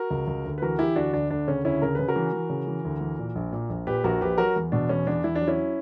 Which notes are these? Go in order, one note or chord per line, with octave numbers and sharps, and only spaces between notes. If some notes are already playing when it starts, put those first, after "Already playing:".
Already playing: F#4 A#4
C#2
C#2
D2
B4
E3 F#4 A#4
E3 E4 G4
D2 D4 F#4
D2 D4
D2 D4
C#3 C#4
D2 C#4 E4
C#3 A#4
C#3 B4
F#4 A#4
E3
E3
C#3
E3
D2
E3
A#2
A#1
A#2
A#1
A#2 G4 B4
A#1 F#4 A#4
A#1 G4 B4
F#3 F#4 A#4
E2
B2 D4
E2 C#4
E2 D4
E2 E4
D4
F#3
C#4 E4